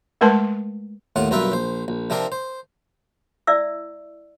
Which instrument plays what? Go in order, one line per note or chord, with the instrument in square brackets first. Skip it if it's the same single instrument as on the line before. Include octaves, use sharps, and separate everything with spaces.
[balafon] G#3 A3 A#4 B4 A5 C6
[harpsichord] D#2 A2 F4 F#5
B1 G2 F4 A#4 B4 E5
A#1 C5
A#1
C3 F3 C4 D4 A#4
C5
[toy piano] E4 D5 E5 E6